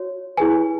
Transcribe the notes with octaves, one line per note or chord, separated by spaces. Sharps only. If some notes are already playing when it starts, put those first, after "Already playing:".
Already playing: F#4 C#5
E4 G#4 B4 G#5